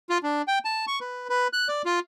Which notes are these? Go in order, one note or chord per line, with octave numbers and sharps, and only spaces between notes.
F4
D4
G5
A5
C#6
B4
B4
F#6
D5
F4